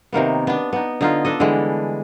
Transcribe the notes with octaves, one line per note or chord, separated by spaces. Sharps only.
C3 D#3 A#3 B3
B3 D4
B3 D#4
D3 D#4 F4
D4 A4 D#5
D3 E3 G3 G#3